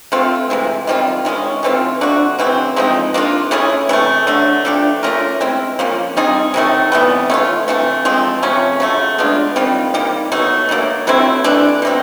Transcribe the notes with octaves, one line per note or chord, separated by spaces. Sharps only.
A3 C4 F4
C3 E3 G#3
D#3 G3 C4 F4
D#3 G#3 C#4
E3 A3 C4 F4
A3 D4 F#4
C#3 E3 A3 C4
F3 G#3 C4 D#4
A#3 D4 F4
A3 C#4 E4 G#4
C3 E3 A3
D3 F#3 A3
F3 A3 D4 G4
A3 C#4 F4 A#4
G#3 C4 E4
F3 A#3 C#4
G3 C4 D#4 G#4
C3 D#3 F#3 A3
C3 E3 G3 B3
A3 C#4 F4
C3 E3 A3
F3 G#3 C4
C3 F3 A3 C#4
C#3 F#3 A3
G#3 B3 D4 F4
D#3 G3 C4 F4
D#3 G3 A#3
B2 F#3 A3
B2 F#3 A#3
F#3 A3 C4 E4
E3 A3 D4
B2 G3 C4